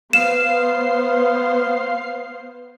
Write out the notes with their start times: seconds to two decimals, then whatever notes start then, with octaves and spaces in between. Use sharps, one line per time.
0.13 B3 C5 F5 C7 E7